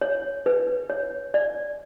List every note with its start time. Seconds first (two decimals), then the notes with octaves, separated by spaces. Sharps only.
0.01 C#5
0.46 B4
0.90 C#5
1.34 D5